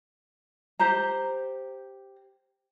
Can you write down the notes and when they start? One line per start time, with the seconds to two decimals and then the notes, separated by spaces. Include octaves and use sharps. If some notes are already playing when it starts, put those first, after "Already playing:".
0.80 G4 C5 A#5